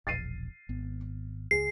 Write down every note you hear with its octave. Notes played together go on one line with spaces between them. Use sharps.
E1 A#1 A6 C7 D#7
G#1 B3
C#2 G#4 C7